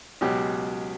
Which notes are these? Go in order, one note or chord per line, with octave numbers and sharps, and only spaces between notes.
C#2 B2 F#3 G4